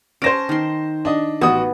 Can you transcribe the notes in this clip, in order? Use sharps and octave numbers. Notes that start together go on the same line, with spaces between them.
C#4 C5 A5 A#6 D7
D#3 C6
D4 D#5
A1 B3 F#4 D#6